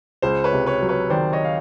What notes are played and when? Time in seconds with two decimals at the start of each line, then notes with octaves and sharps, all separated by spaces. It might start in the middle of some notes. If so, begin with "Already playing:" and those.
0.22 C#2 C5
0.44 B4 C#5
0.53 C3
0.66 B4 C#5
0.82 F#3
0.89 B4 C#5
1.10 D#3 C5 D5
1.33 C#5 D#5
1.44 F5